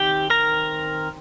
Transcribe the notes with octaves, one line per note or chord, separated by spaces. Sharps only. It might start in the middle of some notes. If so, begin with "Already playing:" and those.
Already playing: D#3 C4 G4 G5
A#4 A#5